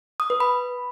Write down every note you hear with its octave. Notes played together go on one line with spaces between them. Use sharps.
D#6
B4
B5